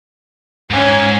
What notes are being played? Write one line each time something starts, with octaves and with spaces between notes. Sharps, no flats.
G#2 C#4 G#5